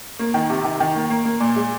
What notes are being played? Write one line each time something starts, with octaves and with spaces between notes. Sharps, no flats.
A#3
D#3
C3
D#3
D#3
A#3
A#3
A#3
A#2
G#3